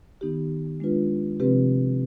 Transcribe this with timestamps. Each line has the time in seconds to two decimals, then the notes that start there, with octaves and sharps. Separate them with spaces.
0.21 D#3 B3 D#4 G4
0.80 G#3 D4 F4 B4
1.40 C3 F3 C4 G4 B4